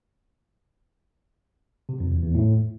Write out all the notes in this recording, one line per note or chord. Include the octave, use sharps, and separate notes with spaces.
C3
F2
E2
E2
A2